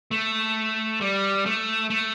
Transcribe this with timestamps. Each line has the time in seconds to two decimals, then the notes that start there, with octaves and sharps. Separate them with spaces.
0.11 A3
1.01 G3
1.46 A3
1.90 A3